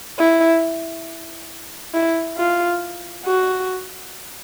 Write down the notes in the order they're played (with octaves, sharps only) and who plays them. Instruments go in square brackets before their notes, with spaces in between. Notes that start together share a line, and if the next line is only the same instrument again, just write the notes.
[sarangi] E4
E4
F4
F#4